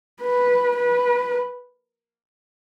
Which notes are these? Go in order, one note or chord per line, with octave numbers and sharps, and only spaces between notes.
B4
B4